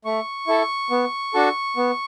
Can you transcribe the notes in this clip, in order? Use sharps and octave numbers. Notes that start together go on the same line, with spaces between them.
A3 C#6
E4 A4
B3
D4 F#4 A4
B3